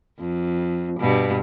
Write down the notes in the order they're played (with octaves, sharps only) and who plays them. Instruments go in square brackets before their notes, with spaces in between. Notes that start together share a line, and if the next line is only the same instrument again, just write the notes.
[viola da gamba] F2
G2 B2